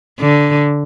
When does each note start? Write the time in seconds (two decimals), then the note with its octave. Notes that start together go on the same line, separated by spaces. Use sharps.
0.20 D3